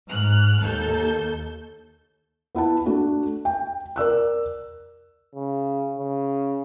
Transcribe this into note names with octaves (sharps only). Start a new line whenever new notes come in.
G#2 F6 F#6
D#2 A4 G6
B3 E4 F#5 A5
A3 D4 F#4
G5
A#4 D5 E6 F#6
C#3
C#3